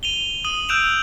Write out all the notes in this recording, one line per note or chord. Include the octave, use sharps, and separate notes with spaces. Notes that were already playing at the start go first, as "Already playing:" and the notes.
D#7 F7 G7
D#6 D#7 F#7
E6 F#6 G6 D7 E7 F7